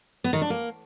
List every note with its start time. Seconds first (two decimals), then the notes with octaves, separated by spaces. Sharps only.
0.24 B3
0.33 D#3
0.41 D4
0.50 A#3